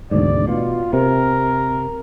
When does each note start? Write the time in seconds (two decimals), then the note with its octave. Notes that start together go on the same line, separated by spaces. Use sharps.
0.11 E1 D2 G#2 D5
0.48 B2 F4
0.93 C3 A#4